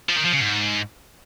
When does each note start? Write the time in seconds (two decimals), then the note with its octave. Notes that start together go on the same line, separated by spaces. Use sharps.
0.09 F3
0.17 D#3
0.25 F3
0.33 C#3
0.40 G#2